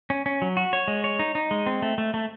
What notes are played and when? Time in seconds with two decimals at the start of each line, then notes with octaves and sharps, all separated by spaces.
0.10 C#4
0.26 C#4
0.42 F#3
0.57 F#4
0.73 C#5
0.88 G#3
1.04 C#5
1.19 D#4
1.35 D#4
1.51 G#3
1.66 C4
1.82 A3
1.98 A3
2.14 A3